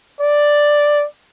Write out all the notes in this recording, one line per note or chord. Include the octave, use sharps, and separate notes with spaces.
D5